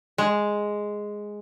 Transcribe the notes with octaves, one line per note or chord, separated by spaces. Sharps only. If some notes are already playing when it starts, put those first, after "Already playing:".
G#3